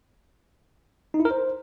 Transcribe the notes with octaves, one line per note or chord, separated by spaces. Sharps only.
D#4
E4
A#4
C5